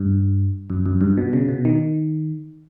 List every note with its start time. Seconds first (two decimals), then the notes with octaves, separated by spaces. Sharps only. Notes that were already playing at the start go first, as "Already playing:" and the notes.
Already playing: G2
0.70 F#2
0.86 F#2
1.01 G2
1.17 B2
1.33 C#3
1.48 B2
1.65 D#3